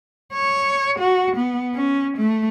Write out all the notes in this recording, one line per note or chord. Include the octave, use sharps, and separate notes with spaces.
C#5
F#4
B3
C#4
A3